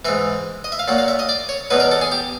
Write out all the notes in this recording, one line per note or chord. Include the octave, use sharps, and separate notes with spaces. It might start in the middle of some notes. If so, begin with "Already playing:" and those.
G#2 E3 E5
D#5
E5
F5
A#2 F#3 F#5
F5
E5
D#5
D5
C#5
E2 B2 F#3 B4
A#4
A4
G#4
G4